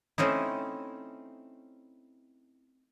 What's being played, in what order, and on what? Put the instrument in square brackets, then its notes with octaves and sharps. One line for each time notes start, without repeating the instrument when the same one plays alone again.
[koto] A3 C4 C#4 D#4 E4